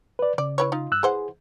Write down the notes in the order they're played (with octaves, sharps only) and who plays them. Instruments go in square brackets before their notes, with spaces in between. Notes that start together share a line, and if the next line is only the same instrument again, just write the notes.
[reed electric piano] B4 D5
[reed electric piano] C#3 [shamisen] D5
[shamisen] E4 B4 C#5
D#4 F4
[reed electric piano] G2 E6 F#6
[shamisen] E3 C5 F#5 [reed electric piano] G#4